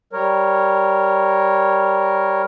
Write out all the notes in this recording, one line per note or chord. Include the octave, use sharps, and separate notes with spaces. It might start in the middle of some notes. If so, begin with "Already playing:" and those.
G3 A#4 C#5